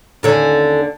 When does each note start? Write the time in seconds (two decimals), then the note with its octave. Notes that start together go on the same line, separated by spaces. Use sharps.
0.23 D#2 D3 C#4